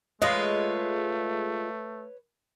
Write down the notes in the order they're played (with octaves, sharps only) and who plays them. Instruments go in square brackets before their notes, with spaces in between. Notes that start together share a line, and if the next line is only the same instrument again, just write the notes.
[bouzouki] G#3 F4 [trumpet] A3 [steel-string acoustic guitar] B4 C#5 [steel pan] D#5